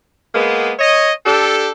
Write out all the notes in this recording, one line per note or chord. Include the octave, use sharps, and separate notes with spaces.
G#3 A#3 B3
C#5 D#5
D4 G4 A4